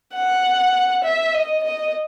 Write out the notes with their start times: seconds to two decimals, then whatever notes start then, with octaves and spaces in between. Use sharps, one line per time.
0.15 F#5
1.04 E5
1.35 D#5
1.64 D#5